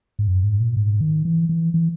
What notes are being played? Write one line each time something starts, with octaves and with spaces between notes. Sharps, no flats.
G#2
F#2
G#2
A#2
G#2
D#3
E3
E3
E3